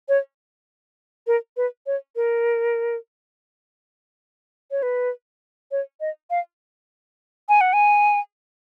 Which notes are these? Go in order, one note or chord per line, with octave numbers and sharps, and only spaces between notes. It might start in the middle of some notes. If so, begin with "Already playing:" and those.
C#5
A#4
B4
C#5
A#4
C#5
B4
C#5
D#5
F5
G#5
F#5
G#5